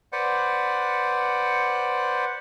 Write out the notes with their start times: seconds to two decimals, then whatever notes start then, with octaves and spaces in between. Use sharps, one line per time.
0.12 B4 C5 D5 F#5